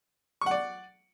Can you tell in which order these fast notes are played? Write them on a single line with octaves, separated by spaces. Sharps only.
C#6 F#5 D5